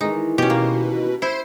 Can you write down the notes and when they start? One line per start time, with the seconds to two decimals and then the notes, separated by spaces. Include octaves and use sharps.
0.01 D#3 E3 G#3 D#4
0.38 B2 C#4 G4
0.50 A#3
1.22 E4 C5